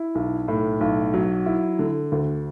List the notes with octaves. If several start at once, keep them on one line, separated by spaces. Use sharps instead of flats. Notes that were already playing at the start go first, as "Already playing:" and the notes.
Already playing: E4
B1
A2
B1
F#3
E4
D3
D2